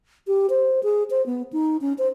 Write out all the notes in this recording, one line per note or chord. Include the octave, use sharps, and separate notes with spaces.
G4
C5
G#4
C5
B3
D#4
C#4
C5